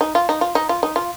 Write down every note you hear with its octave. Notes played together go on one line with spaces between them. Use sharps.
D#4
F4
D#4
F4
D#4
F4
D#4
F4